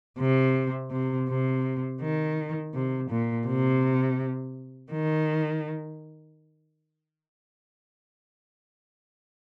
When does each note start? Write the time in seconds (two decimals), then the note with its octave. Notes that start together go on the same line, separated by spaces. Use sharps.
0.19 C3
0.91 C3
1.29 C3
2.02 D#3
2.74 C3
3.10 A#2
3.47 C3
4.92 D#3